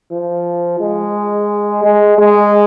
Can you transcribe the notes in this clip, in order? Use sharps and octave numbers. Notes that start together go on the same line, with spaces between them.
F3
G#3
G#3
G#3